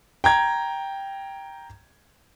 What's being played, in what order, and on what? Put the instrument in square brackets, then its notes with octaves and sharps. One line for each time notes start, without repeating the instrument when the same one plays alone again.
[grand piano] G5 A#5 G#6